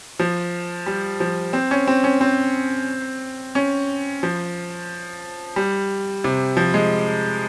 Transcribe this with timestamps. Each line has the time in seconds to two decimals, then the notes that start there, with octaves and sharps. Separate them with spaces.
0.20 F3
0.86 G3
1.20 F3
1.53 C4
1.71 C#4
1.87 C4
2.04 C#4
2.21 C4
3.55 C#4
4.23 F3
5.56 G3
6.24 C3
6.57 F3
6.74 G#3